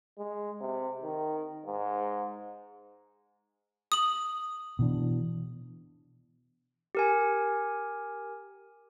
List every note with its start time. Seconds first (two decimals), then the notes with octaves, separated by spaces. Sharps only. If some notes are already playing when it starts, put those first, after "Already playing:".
0.18 G#3
0.61 C3
1.03 D#3
1.66 G#2
3.92 D#6 F#7
4.79 B2 E3 D4
6.95 G4 A#4 G#5